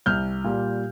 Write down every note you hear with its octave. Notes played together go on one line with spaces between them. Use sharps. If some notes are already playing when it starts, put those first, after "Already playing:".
C2 F6 G6
A#2 G3